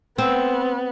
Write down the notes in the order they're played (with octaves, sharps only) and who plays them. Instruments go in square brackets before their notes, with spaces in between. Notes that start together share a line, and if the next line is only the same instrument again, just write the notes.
[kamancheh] B3 [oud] C4